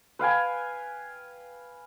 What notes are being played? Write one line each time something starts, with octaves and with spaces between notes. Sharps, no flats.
B4 F5 G5 G#5